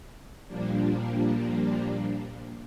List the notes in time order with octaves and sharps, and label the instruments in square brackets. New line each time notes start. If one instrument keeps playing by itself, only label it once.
[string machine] A#2 F3 G3 A#3 D4